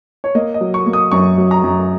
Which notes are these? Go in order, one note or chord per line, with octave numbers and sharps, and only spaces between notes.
C#5
A#3 D#5
D#5
F#3
C#6
A#3
D#6
F#2 C#6
F#3
A#5
F#2